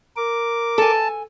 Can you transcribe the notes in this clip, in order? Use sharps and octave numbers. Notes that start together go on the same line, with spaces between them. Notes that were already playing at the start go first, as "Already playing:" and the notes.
A#4 D6
A4 G#5 A5